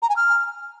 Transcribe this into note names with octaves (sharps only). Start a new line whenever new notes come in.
A#5
G#5
F6